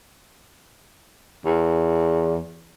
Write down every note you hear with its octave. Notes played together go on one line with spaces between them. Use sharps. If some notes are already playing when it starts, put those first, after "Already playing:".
E2